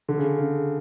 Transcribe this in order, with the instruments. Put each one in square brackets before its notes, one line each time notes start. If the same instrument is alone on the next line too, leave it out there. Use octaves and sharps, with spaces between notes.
[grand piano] D3
C#3
C#3